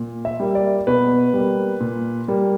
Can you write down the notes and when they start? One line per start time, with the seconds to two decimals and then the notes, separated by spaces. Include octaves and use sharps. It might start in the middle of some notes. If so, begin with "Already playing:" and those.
Already playing: A#2
0.25 E5
0.40 G3 A#3
0.55 D5
0.87 B2 B4
1.34 G3 A#3
1.81 A#2
2.28 G3 A#3